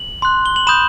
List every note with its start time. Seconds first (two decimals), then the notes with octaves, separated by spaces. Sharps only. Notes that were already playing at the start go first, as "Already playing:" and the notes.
Already playing: F#7
0.22 C6 F#6
0.46 G7
0.56 F#7
0.67 B5 D#6 G6 E7